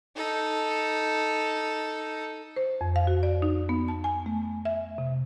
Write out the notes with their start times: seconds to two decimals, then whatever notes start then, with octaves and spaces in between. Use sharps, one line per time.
0.16 D#4 A4
2.57 C5
2.81 F2
2.96 F5
3.07 F#4
3.23 D5
3.42 D#4
3.69 B3
3.88 A5
4.04 G#5
4.26 A3
4.65 E5
4.98 C3